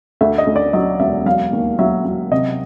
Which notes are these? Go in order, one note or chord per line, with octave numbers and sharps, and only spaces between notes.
D2 E5
D#5
D2
D5
F#3 D#5
E1 E5
F#3 F5
D#2
F#3 E5
F#3
C3 D#5